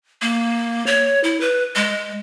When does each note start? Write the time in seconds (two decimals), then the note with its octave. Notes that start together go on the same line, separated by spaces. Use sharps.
0.22 A#3
0.87 C#5
1.24 E4
1.41 B4
1.76 G#3